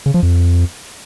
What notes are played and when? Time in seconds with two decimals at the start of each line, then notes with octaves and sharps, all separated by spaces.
0.06 C#3
0.14 F3
0.23 F2